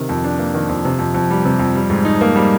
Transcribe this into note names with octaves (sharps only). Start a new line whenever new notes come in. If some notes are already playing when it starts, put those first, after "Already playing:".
Already playing: C3 D#3
F2
D4
A#3
D#3
F2
C3
F2
F2
G3
C3
F2
G3
G#2
D#4
A#3
G3